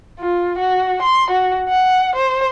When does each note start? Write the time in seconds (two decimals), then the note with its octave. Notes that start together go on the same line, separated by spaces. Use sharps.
0.19 F4
0.59 F#4
1.02 C6
1.31 F#4
1.69 F#5
2.16 C5